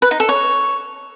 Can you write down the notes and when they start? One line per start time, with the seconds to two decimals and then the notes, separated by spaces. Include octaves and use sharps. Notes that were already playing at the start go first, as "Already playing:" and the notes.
0.02 B4
0.11 D#4
0.20 A4
0.29 C#5